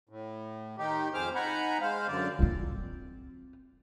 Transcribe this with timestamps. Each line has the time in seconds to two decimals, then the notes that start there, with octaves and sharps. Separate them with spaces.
0.09 A2
0.78 D#3 D#4 G4
1.14 F2 G#4 C5 D6 F6
1.35 D#4 F#5 G#5 A#5 B5
1.81 G#3 C5 F5
2.08 F#2 D3 D5
2.39 C4 F4